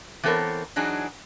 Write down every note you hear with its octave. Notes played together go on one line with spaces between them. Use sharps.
E3 B3 C4 A4 A#4 C#5
E3 F#3 D4 D#4 G#4